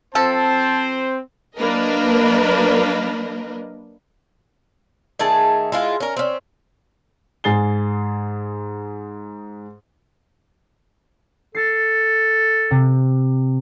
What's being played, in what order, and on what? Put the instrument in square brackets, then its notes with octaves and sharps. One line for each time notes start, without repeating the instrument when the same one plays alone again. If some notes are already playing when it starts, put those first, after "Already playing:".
[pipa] F3 A4 [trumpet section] C4 C5 [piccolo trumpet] A5
[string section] F#3 A#3 D4 A#4 B4 D#5
[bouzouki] D#3 A3 G#4 A5
G#3 E4 F4
C#4 A#4
C4 C#4
[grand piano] G#2 G#4 A6 C7 G7
[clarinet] A4 [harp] A6 C7
[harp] C3